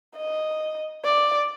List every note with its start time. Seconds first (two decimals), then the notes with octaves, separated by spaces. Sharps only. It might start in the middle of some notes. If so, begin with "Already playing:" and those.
0.17 D#5
1.04 D5